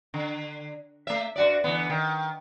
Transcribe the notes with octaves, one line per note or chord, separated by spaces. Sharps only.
D3
A3 E5
G2 F#4 D5
D3 E3 B3
D#3